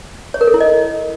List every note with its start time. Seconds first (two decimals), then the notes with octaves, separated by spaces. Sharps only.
0.34 C#5
0.41 A#4
0.47 A4
0.54 E4
0.60 D#5